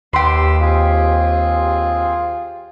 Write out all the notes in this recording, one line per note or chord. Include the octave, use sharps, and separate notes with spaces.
D#2 G4 B4 C6 E6
C4 F4 G#4